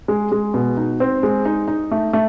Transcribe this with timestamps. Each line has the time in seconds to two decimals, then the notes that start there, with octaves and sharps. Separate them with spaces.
0.08 G#3
0.32 G#3
0.54 B2
0.77 D#4
1.00 C4
1.23 G#3
1.45 D#4
1.68 D#4
1.91 A3
2.13 A3